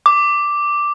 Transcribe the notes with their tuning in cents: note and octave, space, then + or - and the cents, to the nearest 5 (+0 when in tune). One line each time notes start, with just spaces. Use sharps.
D6 +0